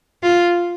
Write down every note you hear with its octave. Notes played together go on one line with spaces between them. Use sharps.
F4